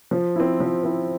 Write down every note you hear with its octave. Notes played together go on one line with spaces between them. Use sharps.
F3
C4 E4
F3
C4 E4